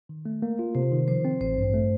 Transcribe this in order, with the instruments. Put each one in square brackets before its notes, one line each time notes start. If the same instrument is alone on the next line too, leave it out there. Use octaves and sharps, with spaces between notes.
[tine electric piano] D#3
A3
A#3
F4
[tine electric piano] C3 [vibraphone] C5
[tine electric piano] D#3
[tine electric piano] F3 [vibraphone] C5
[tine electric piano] C4
[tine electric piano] A1 [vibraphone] C5
[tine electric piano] G2
A3